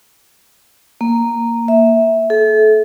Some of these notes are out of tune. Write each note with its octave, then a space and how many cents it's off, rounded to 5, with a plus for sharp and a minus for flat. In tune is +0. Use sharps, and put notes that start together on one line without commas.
A#3 -5
E5 -10
A4 -35